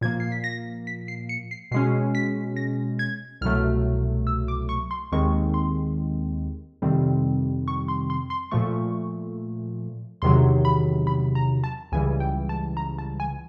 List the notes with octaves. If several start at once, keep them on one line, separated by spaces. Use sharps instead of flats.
A#2 F3 A#3 G#6
C7
B6
A#6
B6
C7
C#7
C7
B2 G#3 C#4 C7
B6
A#6
G#6
C2 B2 F#3 A3 F6
E6
D6
C#6
C6
D#2 D#3 G#3 C4 C#6
C6
F2 C3 D#3 G3 C4
C#6
C6
C6
C6
A#2 F3 A3 C#6
E2 C3 D#3 F#3 C6
B5
B5
A#5
A5
C#2 C#3 E3 G3 G#5
G5
A5
A#5
A5
G#5